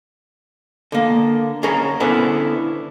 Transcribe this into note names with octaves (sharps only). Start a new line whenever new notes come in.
D3 A#3
C#4 G#4 A#4 C#5 A#5
D3 B3 C#4 E4 B4 C5